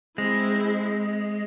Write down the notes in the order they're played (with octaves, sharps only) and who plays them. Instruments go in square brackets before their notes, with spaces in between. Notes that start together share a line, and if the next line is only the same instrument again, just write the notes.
[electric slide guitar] G#3 [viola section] C4 E4 G#4